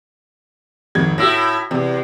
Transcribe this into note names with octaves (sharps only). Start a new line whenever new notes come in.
G#1 F2 G#6
A2 E4 F#4 E6 A#6
E2 C3